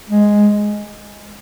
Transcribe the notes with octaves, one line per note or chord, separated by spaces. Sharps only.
G#3